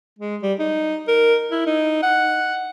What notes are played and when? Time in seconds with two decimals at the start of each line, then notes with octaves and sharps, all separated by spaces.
0.19 G#3
0.42 G3
0.59 D#4
1.08 A#4
1.51 E4
1.66 D#4
2.02 F#5